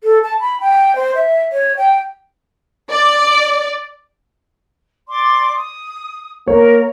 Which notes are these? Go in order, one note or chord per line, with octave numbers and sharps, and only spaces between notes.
A4
A5
B5
G5
C5
E5
C#5
G5
D5
D5 C6 D6
D#6
A#3 A#4 C#5